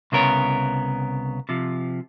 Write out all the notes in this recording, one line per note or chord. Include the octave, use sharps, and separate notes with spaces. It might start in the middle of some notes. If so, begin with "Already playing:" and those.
C2 C#3 B3 A#4 C#5
C3 F3